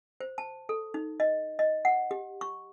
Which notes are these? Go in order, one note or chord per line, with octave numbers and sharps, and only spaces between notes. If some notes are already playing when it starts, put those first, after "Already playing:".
C5
A5
A4
D#4
D#5
D#5
F#5
G4
C#6